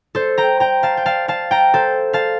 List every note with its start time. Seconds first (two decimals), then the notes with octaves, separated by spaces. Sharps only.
0.15 A4 C5
0.38 G5 A#5
0.60 G5 A#5
0.83 F5 A5
0.97 G5
1.06 F5 A5
1.28 F5 A5
1.51 G5 A#5
1.74 A4 C5
2.13 F5 A5